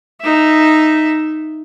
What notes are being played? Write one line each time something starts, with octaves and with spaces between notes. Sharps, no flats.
D#4 E5